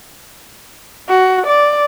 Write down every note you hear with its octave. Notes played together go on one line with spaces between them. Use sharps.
F#4
D5